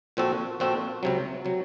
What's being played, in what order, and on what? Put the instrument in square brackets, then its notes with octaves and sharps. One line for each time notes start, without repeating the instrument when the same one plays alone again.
[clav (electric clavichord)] A#2 F3 C4 F#4 A4
A#2 F3 C4 F#4 A4
C#2 C3 F#3
C3 F#3